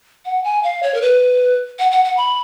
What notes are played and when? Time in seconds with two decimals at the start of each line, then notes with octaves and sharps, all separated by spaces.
0.25 F#5
0.44 G#5
0.63 F5
0.83 C#5
0.94 A#4
1.02 B4
1.79 F#5
1.92 F#5
2.05 F#5
2.17 B5